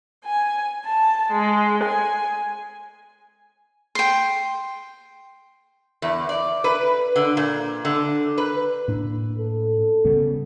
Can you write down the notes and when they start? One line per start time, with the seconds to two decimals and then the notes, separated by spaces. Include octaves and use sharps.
0.25 G#5
0.85 A5
1.33 G#3
1.84 G#5
3.95 G5 C6
6.02 E2
6.29 D5
6.64 B4
7.16 D3
7.37 A#2
7.85 D3
8.38 B4
8.88 A2 A#3 D4
9.38 A4
10.05 C#3 G3 B3